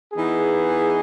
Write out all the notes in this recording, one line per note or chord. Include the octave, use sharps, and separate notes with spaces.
E3 B3 D#4 G#4